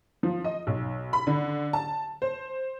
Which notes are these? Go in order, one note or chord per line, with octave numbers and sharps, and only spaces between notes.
F3
D#5
B1
B5
D3
A5
C5